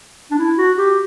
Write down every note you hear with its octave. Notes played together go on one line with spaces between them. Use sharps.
D4
E4
F#4
G4